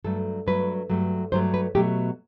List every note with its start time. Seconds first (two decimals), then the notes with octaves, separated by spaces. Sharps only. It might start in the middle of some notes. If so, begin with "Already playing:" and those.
0.04 G2 F#3 A3 A4
0.46 G2 F#3 A3 B4
0.90 G2 F#3 A3
1.32 G2 F#3 A3 C5
1.54 B4
1.75 B2 F#3 A3 G4